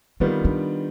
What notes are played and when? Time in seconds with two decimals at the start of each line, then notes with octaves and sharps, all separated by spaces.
0.20 D#3 G3 B3 C4 F4
0.45 D4